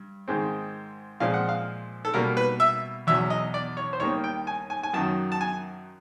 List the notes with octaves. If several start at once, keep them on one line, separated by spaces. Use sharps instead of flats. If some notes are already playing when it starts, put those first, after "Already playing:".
Already playing: G2
G#2 D#3 G#3 C4
A#2 F3 G#3 C4 F5
F#5
F5
A4
B2 G3 A#3 A#4
B4
E5
E2 B2 F#3 E5
D#5
D5
C#5
C5
D#2 D#3 G3 A#3 C#5
G5
G#5
G#5
G#5
F#2 D#3 F#3 A5
A5
G#5